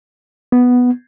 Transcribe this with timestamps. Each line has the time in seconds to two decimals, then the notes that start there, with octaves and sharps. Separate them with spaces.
0.52 B3